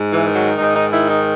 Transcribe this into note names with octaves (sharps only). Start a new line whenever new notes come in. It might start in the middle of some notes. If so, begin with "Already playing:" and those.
Already playing: G#2
E3
D#3
F#3
G#2 D#4
D#4
D#3 E4
D#4